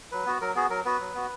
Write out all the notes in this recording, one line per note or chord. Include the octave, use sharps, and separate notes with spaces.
F#3 B4
B3 F#4
F#3 A#4
B3 F#4 G#4
F#3 A#4
B3 F#4 B4
F#3
B3 F#4